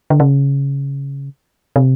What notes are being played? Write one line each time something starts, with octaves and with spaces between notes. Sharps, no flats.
D3
C#3
C3